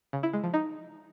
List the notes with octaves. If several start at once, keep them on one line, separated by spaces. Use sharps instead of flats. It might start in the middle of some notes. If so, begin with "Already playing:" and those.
C#3
E4
G#3
F3
D#4